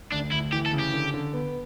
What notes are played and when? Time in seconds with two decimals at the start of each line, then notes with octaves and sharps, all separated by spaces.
0.12 D2 D4
0.32 D2 E4
0.52 E3 G4
0.66 A4
0.73 C#3
0.80 G4
0.94 D3
1.14 D3
1.33 B3